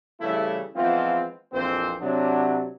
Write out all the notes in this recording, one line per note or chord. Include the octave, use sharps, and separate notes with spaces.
C#3 E3 G3 A3 E4
E3 F3 G#3 B3 C4 F4
A#1 F2 E3 C4 C5
C3 F#3 D4